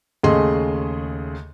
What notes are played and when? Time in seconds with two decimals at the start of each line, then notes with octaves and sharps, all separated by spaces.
0.23 D#2 C#3 A3 G#4 D#5 C6